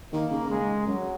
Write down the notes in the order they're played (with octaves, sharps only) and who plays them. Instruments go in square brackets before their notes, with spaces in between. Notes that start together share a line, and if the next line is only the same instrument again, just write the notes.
[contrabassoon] D#3 [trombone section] A#3
[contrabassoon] C#3
[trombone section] G#3
[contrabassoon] F#2 [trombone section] F#3